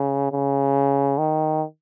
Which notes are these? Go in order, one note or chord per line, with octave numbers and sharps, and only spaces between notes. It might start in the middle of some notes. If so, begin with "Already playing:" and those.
Already playing: C#3
C#3
D#3